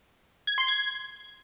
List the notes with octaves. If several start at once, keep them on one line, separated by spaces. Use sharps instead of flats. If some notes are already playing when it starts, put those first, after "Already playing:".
G#6
C6
G#6